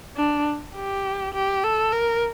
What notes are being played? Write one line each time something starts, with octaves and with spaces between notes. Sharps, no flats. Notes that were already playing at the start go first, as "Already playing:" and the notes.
D4
G4
G4
A4
A#4